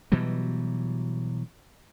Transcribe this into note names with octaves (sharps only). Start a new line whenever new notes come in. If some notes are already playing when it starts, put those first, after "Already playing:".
B2 E3 F#3 G3